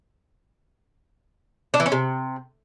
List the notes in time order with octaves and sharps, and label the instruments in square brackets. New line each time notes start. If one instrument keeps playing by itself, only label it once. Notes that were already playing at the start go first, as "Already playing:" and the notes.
[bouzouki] D4
E3
C#4
C3